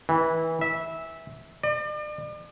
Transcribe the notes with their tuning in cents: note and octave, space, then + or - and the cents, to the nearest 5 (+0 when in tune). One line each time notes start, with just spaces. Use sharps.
E3 -20
E5 -15
D5 +40